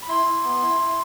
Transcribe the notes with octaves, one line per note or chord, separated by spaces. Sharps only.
B5
E4 C6
E4
B3
E4
E4